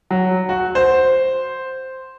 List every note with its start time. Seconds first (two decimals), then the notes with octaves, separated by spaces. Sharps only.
0.11 F#3
0.49 F#4
0.75 C5